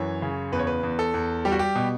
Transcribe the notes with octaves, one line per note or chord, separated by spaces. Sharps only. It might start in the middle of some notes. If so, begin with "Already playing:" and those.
Already playing: F#2 E3 C#5
C#3
E2 B4
C#5
B4
E2
A4
E2
G3 G4
F#4
G4
B2